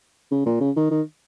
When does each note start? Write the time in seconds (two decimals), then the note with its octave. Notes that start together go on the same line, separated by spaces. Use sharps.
0.31 C#3
0.46 A#2
0.60 C#3
0.76 D#3
0.91 D#3